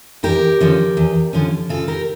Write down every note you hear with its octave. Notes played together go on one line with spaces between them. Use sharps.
E2 G4 A#4
D3 F3 C#4
E2
D3 F3 C#4
C#3 F4 A4
G4 A#4